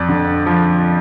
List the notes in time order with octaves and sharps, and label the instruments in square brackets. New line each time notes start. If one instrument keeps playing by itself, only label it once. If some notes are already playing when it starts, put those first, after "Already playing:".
Already playing: [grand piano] F2 D5
D3
F3